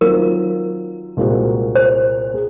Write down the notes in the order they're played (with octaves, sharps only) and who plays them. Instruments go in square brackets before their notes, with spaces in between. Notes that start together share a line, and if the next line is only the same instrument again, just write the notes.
[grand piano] D#3 F#3 C4 F4 [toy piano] A#4
[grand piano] C2 A#2 G#3 C4 F#4
[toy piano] C5
[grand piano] G#4